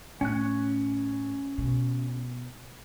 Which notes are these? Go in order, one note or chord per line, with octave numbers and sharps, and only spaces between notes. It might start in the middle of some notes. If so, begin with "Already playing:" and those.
A2 C#4 F#6
B2